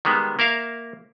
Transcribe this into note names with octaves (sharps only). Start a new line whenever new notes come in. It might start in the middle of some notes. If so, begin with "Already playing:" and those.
D#3 G3 G#3 B3
A#3 A#4 E5 F5